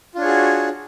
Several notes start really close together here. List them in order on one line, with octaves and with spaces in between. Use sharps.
F4 D4 C#5 G#4 F#4